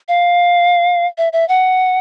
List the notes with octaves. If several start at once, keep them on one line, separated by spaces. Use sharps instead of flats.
F5
E5
E5
F#5